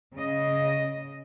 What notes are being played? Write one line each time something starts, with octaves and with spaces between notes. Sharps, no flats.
C#3 D#5